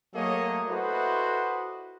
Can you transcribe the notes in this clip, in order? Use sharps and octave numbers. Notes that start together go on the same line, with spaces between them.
F#3 A3 A#3 G#4 C#5 D#5
E4 F#4 A4 B4 C5 D#5